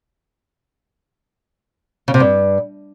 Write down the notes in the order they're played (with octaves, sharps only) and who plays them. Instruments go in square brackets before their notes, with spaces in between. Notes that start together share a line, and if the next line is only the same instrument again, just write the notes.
[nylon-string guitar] C#3
C3
G2